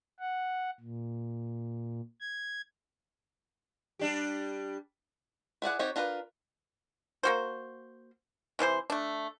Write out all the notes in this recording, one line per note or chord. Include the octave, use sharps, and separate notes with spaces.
F#5
A#2
G#6
G3 D4 G4
E4 G#4 D5 F#5
C4 D#4 F#4 G4 C#5
D4 F4 A#4 B4
A#3 F#4 C5
C3 E3 C#4 C5
A3 D4